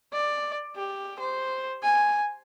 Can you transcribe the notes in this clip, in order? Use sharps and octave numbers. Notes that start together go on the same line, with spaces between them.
D5
G4
C5
G#5